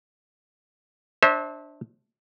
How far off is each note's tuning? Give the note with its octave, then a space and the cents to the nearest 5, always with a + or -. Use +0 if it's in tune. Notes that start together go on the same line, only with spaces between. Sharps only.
D4 +0 C5 +30 E5 -30